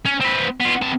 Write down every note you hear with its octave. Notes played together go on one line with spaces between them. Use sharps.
C#4
C4 B4
B3 F4
C3 A5